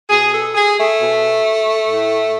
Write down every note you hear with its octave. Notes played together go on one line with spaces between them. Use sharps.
B2 G#4
A4
G#4
A3
B2
A2